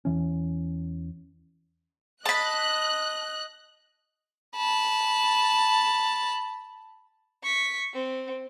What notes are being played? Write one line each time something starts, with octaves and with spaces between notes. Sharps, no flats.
E2 E3 C#4
D#5 A5 B5 F#6
A5 B5
C#6 B6
C4